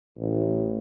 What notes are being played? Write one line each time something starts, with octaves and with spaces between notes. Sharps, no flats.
A1